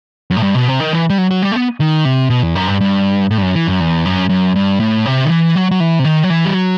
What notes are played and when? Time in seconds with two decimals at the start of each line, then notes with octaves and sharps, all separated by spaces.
0.30 F#2
0.37 A2
0.43 G2
0.55 B2
0.68 C3
0.80 D#3
0.93 E3
1.10 G3
1.18 F#3
1.31 F#3
1.42 G3
1.52 A3
1.56 B3
1.80 D#3
2.05 C3
2.30 B2
2.43 E2
2.55 F#2
2.67 G2
2.81 G2
3.31 A2
3.38 G2
3.42 F#2
3.55 E3
3.67 F#2
3.80 E2
4.05 F#2
4.30 F#2
4.56 G2
4.80 A2
5.06 C3
5.25 D#3
5.30 E3
5.55 F#3
5.71 F#3
5.80 E3
5.99 C3
6.05 D#3
6.23 F#3
6.30 E3
6.45 G3
6.54 F#3